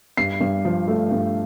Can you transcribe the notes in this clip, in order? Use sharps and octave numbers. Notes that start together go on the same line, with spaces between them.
G2 C7
G2
F3
A3
G2